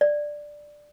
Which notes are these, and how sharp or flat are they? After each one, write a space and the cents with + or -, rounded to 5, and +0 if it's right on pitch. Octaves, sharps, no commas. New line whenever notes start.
D5 +5